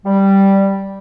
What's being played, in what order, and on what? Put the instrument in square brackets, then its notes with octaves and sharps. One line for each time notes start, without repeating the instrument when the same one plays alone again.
[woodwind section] G3